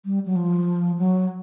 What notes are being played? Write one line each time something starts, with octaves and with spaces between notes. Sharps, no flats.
G3
F#3
F3
F#3